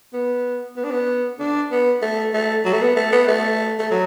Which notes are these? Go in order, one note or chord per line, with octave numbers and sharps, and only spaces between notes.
B3
B3
D4
B3
D4
B3
A3
A3
F#3
A3
B3
A3
B3
A3
A3
F#3